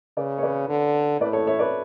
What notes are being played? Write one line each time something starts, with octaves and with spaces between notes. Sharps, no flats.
C#3 B4 D5
C#5
B4 D5
D3
A2 B4 D5
A4 C#5
C#5 E5
B4 D5